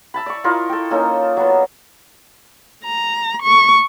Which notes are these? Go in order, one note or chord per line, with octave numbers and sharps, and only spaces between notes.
E5 A5 B5
D5 C#6
E4 F4 A#4 D#5
A4 G5
A#3 C#4 D#4 A4
F#3 B3
A#5
C#6